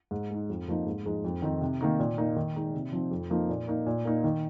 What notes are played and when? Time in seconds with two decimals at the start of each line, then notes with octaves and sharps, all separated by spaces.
0.11 G#2
0.30 G#3 D#4
0.50 F2
0.68 F3 A#3 D#4
0.86 G#2
1.06 F3 G#3 D#4
1.24 F2
1.42 D#3 C4 D#4
1.61 C3
1.81 D#3 A#3 D#4
1.99 A#2
2.18 A#3 D#4
2.36 D#3
2.56 G#3 D#4
2.74 C3
2.92 F3 C4 D#4
3.11 F2
3.30 F3 A#3 D#4
3.49 A#2
3.68 A#3 D#4
3.86 A#2
4.05 A#3 D#4
4.24 D#3